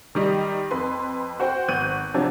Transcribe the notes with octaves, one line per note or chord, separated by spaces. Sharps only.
D#3 G3 D#5
F2 B4 C6
F#4 C5 G5
G#1 B3 C#6 F#6 G6 D#7
C3 F3 F#3 C4 D4